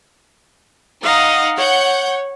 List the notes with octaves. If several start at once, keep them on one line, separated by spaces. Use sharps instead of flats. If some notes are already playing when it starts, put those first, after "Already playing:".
D#4 D#5 F5 F#5
C#5 F#5 G6